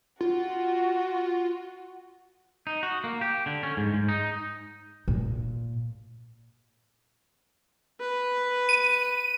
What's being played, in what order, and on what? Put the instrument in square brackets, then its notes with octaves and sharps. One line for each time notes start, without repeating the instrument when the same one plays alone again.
[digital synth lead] F4 [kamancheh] F#4
[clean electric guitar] D#4
F#4
A#3
G4
D3
C#4
G#2
G#2
D#4
[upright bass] A#2
[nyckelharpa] B4
[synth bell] D#7